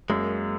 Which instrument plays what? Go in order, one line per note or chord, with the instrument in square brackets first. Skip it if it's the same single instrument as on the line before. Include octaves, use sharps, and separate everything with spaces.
[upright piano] F#2 [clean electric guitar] G#3 A#3